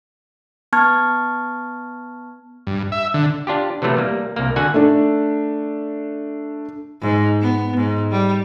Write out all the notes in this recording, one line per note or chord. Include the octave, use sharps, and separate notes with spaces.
B3 A5 C#6 F6 G#6
G2
E5
D3
D4 F4 G4
C3 E3 F#3 A3 B3
G3 A#3
C2 A#3
D3 F#4 F#5 G#5
A3 D4 A4
G#2
B3
G#2
G3